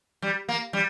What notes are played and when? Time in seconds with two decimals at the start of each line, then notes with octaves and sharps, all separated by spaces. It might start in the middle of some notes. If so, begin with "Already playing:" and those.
0.22 G3
0.49 A#3
0.73 G3